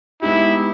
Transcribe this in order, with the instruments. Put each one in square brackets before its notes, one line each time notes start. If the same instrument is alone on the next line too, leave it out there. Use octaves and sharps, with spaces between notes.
[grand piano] G#3 B3 D#4 G4 [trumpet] E4